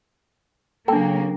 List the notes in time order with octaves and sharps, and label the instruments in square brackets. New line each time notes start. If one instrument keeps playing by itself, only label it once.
[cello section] C#3 F#3 A#3 [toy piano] D4 G5 [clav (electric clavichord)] A4